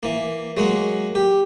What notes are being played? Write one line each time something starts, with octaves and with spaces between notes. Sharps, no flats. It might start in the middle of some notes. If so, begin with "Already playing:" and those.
E3 A#3
F#3 G#3 A#3 F#5
G4